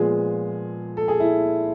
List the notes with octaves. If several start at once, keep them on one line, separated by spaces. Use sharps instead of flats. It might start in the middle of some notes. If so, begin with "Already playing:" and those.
Already playing: A#2 F3 G#3 B3 G#4
A4
G#4
E4